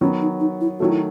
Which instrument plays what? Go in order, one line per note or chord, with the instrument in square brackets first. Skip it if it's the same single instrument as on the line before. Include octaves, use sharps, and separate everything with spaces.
[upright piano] D#3 F#3 B3 [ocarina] C#4
[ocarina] D#4
D#4
E4
[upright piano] D#3 F#3 A3 [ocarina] F#4
[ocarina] E4